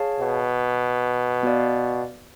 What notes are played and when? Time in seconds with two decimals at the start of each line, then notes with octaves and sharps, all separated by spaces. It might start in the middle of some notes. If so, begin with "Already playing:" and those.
Already playing: G#4 C#5 F5 A5
0.20 B2
1.43 B3 F#4 B4 D5 F5